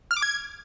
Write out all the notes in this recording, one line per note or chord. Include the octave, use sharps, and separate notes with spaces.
F6
D6
G#6